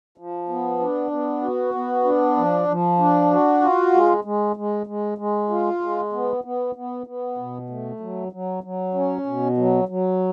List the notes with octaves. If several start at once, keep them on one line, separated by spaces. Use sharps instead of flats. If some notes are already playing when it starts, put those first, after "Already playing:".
F3
B3
D4
B3
F#4
B3
D4
F3
F3
D4
F#4
F4
G#3
G#3
G#3
G#3
G#3
F4
G#3
B3
B3
B3
B3
B2
A3
F#3
F#3
F#3
C#4
B2
F#3
F#3